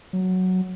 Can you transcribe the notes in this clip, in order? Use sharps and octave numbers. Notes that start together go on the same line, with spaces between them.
F#3